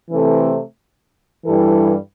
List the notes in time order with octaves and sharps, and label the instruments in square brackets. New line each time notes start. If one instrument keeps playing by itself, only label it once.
[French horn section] C3 E3 A3 C4 A4
G2 E3 G3 E4 A4